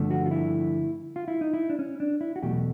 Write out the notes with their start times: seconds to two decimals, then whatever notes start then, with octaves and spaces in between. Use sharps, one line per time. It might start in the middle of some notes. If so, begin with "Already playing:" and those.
Already playing: G2 D3 F3 A3
0.11 F#4
0.26 F4
0.31 E4
1.16 F4
1.28 E4
1.41 D#4
1.53 E4
1.70 D4
1.79 C#4
2.00 D4
2.21 E4
2.36 F#4
2.42 E2 B2 F#3 A3 G4